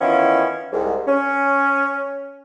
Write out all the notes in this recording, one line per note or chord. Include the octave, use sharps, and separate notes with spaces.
D#3 E3 B3 C#4 E4 F4
C2 G#2
C#4